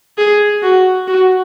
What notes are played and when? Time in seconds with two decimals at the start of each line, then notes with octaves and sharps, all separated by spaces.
0.18 G#4
0.63 F#4
1.07 F#4